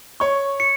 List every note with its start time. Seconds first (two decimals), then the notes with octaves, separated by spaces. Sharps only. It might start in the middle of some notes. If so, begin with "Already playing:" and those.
0.20 C#5 C#6
0.60 C#7